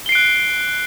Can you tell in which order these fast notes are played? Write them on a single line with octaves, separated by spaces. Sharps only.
G7 C7 D7 F#6